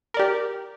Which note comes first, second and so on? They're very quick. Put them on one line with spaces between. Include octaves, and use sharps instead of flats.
A#4 D5 G4